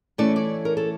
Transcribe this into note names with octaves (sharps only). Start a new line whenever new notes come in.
E3 A3 C#4 E4 D5
D5
A#4
A4